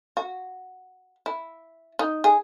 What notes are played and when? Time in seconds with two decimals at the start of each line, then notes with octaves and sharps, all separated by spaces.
0.17 F#4
1.26 E4
1.99 D#4
2.24 G#4